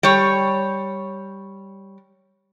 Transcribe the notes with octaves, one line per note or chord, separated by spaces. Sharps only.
G3 C#5